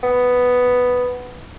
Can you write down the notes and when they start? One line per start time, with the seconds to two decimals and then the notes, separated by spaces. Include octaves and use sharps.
0.03 B3